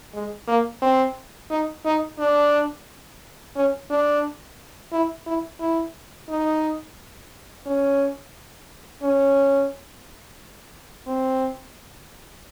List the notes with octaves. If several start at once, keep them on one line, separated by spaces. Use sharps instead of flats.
G#3
A#3
C4
D#4
D#4
D4
C#4
D4
E4
E4
E4
D#4
C#4
C#4
C4